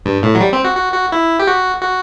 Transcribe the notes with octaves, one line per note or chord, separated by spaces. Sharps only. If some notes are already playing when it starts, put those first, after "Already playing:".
G2
A2
F#3
G3
C4
F#4
F#4
F#4
E4
G4
F#4
F#4